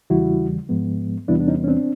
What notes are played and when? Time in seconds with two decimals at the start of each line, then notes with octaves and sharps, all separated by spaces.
0.10 E2 C#3 E3 G3 E4 F#4
0.69 G#2 F3 G#3 B3
1.28 E2 C3 E3 G3 B3 D4 E4
1.40 D4
1.48 C#4 D#4
1.64 C#4
1.68 C4 D4